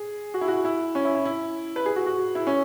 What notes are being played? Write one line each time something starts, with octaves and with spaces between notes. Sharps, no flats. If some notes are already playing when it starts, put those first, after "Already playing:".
Already playing: G#4
F#4
E4
F#4
E4
C#4
E4
E4
E4
B4
G#4
F#4
F#4
E4
C#4